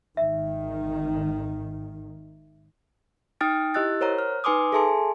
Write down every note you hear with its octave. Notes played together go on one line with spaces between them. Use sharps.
G#1 D#3 E5
D#4 G5 D#6 F6 A6 D7
E4 G4 D#5 E6 F#6 A6
A#4 C5 C#5 F#5 A#5
F6
D#4 B4 G#5 C6 D6 D#6
G#4 A4 E5 G#5 A5 C6